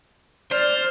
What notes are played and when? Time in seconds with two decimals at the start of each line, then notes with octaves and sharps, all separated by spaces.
0.51 C5 D5 F6